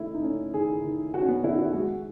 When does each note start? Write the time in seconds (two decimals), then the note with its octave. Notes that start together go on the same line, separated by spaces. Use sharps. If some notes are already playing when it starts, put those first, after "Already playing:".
Already playing: D#3 A3 E4
0.14 D#4
0.23 A3 C#4
0.54 D#3 G#4
0.84 D#3
1.13 D#3 F#4
1.21 C#4
1.28 B3
1.44 D#3 E4
1.59 E4
1.73 G#3 F#4